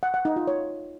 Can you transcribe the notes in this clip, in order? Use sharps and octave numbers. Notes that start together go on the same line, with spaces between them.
F#5
F#5
D#4
F4
C#5